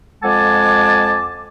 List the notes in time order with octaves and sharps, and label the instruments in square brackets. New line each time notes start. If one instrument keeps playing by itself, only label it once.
[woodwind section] F2 G#3 F#5 G#5 A5 D6